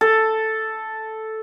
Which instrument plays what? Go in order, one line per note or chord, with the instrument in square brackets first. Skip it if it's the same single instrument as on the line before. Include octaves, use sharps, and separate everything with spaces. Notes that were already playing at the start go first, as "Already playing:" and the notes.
[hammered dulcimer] A4